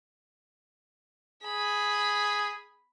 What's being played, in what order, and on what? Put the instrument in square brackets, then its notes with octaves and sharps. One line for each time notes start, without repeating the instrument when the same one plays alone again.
[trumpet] G#4 [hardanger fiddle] B5